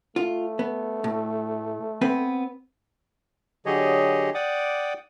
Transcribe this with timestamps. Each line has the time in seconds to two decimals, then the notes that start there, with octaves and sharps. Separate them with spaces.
0.16 A3 F4
0.59 B3
1.04 A2
2.01 B3 C4 B4
3.66 D3 F#3 G4 G#4 C#5 D#5
4.35 D5 F#5 G5 D6 D#6